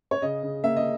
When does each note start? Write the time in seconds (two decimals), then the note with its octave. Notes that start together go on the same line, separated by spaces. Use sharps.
0.11 C#5
0.22 C#3 D#5
0.43 C#3
0.64 A#3 E5
0.76 D#5